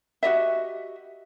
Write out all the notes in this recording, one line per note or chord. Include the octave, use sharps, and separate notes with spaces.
F#4 G4 D#5 E5